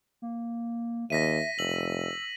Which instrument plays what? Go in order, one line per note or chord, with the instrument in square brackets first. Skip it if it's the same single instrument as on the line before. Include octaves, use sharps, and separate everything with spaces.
[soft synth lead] A#3
[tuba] D#2 [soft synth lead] E5 [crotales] A#6 B6 D#7
[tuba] F1 [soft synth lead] E6 [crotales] F#7